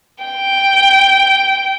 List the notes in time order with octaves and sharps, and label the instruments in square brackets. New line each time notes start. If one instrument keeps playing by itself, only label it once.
[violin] G5